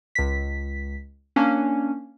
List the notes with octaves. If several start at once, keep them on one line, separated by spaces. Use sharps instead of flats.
C#2 B6
A#3 C#4 D4